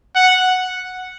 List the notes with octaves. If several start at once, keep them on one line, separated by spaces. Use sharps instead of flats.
F#5